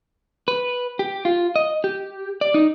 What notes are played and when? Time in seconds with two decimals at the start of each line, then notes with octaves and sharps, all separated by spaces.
0.48 B4
0.99 G4
1.25 F4
1.56 D#5
1.84 G4
2.41 D5
2.54 D#4